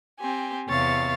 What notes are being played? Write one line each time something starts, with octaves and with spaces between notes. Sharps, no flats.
C4 G4 G#5
E2 C3 C#5 F5 A6